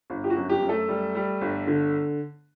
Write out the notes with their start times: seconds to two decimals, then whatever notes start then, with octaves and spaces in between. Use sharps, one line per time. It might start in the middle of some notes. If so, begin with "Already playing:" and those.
0.10 G1
0.24 G4
0.30 F#4
0.36 F#2
0.49 G4
0.63 F#2
0.69 A3 A4
0.88 G3
1.15 G3
1.41 G1
1.67 D3